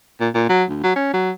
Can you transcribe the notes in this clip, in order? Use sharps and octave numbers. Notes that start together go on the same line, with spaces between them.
A#2
A#2
F#3
D2
F#3
C#4
F#3